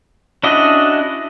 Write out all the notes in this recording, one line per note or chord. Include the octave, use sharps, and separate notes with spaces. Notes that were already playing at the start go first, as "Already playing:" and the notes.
C#4 D4 E4 F#4 D#5